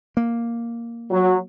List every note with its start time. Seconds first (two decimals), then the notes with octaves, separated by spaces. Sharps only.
0.17 A#3
1.10 F#3